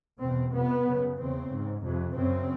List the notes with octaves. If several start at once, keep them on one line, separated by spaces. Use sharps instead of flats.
E2 B2 C4
F2 C3 B3
F#2 C#3
E2 C#3 C4
G#2
F2 C3
F#2 C#3 C4